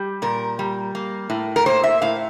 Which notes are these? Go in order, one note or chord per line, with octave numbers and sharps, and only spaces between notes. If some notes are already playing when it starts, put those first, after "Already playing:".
Already playing: G3 G4
A#2 A#4
G3
A#3
A2
A#4
A#3 C5
E5
A2 F5